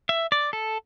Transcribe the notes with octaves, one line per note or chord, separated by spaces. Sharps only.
E5
D5
A4